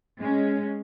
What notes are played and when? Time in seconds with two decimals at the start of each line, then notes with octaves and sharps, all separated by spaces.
0.19 G#3 C#4